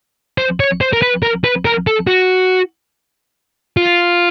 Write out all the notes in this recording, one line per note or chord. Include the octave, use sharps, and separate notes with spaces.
C5
C#5
C5
A#4
B4
A#4
B4
A#4
A4
F#4
F4